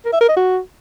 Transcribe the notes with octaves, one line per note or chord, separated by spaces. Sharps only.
A#4
E5
A#4
D#5
F#4